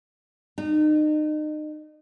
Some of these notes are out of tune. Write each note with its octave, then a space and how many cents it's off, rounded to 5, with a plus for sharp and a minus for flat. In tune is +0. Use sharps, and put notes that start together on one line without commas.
D#4 -35